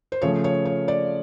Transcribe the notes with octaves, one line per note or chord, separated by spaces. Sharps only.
C5
C#3 F3 A3 C#5
C#5
C#5
D5